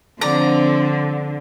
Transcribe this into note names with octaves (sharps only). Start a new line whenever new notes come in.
D3 F3 C4 D5 A#5